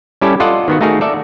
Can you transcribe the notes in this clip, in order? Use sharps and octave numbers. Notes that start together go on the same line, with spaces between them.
G3 C#4 E4 G4 A4
F4 A4 D5 D#5 F#5
D#3 B3 F#4
A3 D#4 F#4 G#4 A#4
A4 D5 E5